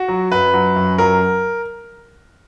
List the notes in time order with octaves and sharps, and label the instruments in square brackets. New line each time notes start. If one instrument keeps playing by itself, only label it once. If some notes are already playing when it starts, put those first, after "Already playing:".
Already playing: [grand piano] F#4
F#3
F#2 B4
F#3
F#2
F#3 A#4